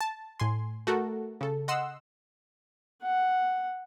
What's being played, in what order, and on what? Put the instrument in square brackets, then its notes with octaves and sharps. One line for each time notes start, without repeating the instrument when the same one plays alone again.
[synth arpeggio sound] A5
A2 G#5 C6
A3 F#4 A4 A#4
C#3 A4
D#5 F#5 C6 E6
[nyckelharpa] F#5